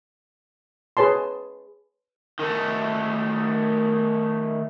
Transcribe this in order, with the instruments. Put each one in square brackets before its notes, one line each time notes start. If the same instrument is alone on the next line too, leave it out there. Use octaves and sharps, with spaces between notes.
[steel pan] G#4 B4 C#5 A5 C6
[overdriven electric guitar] D#3 A3